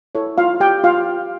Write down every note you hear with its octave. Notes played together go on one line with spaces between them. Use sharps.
E4 A4 C#5
F4 F5
G4 G5
F4 F5